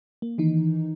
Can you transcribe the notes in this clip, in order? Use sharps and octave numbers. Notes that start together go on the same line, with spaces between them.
A#3
D#3 E3 D#4